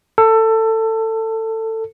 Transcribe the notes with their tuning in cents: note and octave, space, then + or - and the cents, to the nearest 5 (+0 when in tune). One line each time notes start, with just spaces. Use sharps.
A4 +20